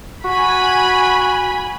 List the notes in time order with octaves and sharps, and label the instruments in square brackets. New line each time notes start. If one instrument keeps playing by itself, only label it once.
[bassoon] F#4 [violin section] G#5 B5